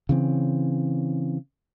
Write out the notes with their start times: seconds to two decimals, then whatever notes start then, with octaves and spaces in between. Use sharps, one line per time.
0.09 C#3 E3 C4